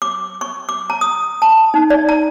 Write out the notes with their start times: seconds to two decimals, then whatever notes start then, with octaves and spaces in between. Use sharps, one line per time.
0.02 D6
0.41 C#6
0.69 D6
0.90 A#5
1.01 D#6
1.42 A5
1.74 D#4
1.90 D5
2.09 A#5